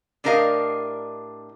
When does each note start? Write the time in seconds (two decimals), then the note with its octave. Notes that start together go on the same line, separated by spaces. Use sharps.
0.24 A2 D4 G4 A#4 D#5 F5